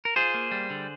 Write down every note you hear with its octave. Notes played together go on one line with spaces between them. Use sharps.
A#4
F4 G#4 C5
A#3
G3
D3